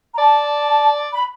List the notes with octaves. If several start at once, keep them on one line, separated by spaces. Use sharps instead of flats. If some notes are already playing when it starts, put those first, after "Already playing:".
A#5
D5 A5
B5